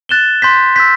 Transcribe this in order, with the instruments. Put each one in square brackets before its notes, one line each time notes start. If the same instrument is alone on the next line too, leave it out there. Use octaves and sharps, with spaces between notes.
[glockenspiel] F#6 A6 E7 G7
C6 G6 B6
E6 G6 B6